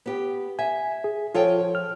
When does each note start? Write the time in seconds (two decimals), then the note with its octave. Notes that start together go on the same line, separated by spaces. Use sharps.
0.06 B3 G4
0.59 E5 G#5
1.04 G#4
1.35 F3 F4 A4 C#5 G5
1.75 F6